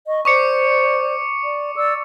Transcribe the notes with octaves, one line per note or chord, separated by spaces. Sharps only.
D#5 C#6
C5 D5 C#6 D6 C#7
D5
D5 E6